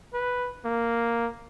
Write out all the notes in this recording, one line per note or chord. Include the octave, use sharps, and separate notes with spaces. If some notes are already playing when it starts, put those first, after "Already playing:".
B4
A#3